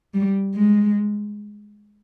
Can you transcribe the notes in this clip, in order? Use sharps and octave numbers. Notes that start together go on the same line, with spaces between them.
G3
G#3